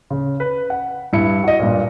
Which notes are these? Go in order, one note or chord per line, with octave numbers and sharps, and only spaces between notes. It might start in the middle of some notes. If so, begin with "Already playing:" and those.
C#3
B4
F#5
G2 E4 C#7
F#4 D#5
G2 A#2